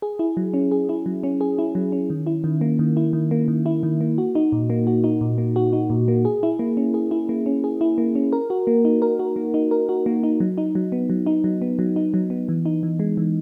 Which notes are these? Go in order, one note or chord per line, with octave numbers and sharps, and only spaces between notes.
G#4
E4
F#3
C#4
G#4
E4
F#3
C#4
G#4
E4
F#3
C#4
D#3
E4
D#3
A#3
D#3
E4
D#3
A#3
D#3
E4
D#3
A#3
F#4
D#4
A#2
A#3
F#4
D#4
A#2
A#3
F#4
D#4
A#2
A#3
G#4
E4
A#3
C#4
G#4
E4
A#3
C#4
G#4
E4
A#3
C#4
A#4
F#4
A#3
D#4
A#4
F#4
A#3
D#4
A#4
F#4
A#3
D#4
F#3
D#4
F#3
B3
F#3
D#4
F#3
B3
F#3
D#4
F#3
B3
E3
D#4
E3
G#3
E3